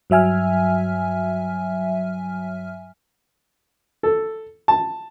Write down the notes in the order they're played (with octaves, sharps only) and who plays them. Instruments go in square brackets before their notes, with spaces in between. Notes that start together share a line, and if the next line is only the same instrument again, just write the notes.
[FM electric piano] G2 F#3 E5 G#5 F6
[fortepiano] A4
A5